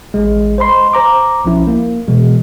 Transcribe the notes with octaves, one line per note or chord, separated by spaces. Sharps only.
A1 G#3
C5 D#5 B5 C6
C5 A#5 D6
B1 F3 C#4 E4
A#3
B2 E3 G#3